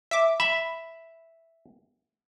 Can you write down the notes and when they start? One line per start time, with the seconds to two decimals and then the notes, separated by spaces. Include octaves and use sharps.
0.11 E5 D6
0.40 E5 B5